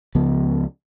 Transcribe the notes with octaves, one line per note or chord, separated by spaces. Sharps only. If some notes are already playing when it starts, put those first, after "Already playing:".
C#2 C#3 F3 B3